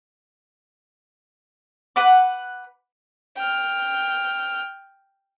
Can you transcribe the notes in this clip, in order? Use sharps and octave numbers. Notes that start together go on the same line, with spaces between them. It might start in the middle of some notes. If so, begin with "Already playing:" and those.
B4 F#5 D6
G5 F6